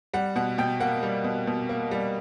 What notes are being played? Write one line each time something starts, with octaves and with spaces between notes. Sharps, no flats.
G3 F#5
B2 F#5
B2 G5
A#3 F#5
G3
B2
B2
A#3
G3